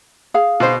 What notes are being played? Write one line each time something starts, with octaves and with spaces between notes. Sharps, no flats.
G#4 F5
B2 C5